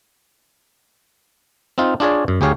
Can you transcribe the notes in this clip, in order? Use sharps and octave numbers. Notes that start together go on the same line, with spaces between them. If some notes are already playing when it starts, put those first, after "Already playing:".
C4 D#4 F4
D4 F4 G#4 C#5 D5
F#2
D2 G4 G#4 C#5 F5